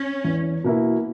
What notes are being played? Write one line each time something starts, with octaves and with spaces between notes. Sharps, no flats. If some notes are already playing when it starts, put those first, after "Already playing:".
Already playing: C#4
E2
B2 A#3 E4